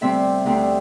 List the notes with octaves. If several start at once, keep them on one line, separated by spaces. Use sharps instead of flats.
D2 C3 G3 C4 E5
D2 C3 G3 C4